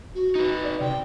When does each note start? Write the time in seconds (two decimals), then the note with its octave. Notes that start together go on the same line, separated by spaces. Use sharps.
0.15 F#4
0.35 D#4 B4
0.63 D5
0.80 C3 G5